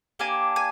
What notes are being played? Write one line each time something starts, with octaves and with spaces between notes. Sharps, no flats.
A#3 D4 G4 G#5
G#5